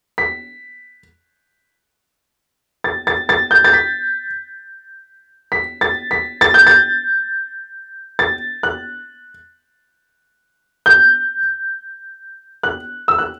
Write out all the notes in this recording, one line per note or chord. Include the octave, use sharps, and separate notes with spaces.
B6
A6
A6
A6
G6
A6
B6
B6
A6
B6
A6
G6
A6
A6
F#6
G6
F#6
E6
F#6